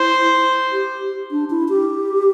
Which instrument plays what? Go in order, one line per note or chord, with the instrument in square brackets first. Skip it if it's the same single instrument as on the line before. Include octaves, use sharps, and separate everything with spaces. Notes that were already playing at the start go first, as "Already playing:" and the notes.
Already playing: [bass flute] E4 [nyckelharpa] C5
[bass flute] G4
D4
E4
G4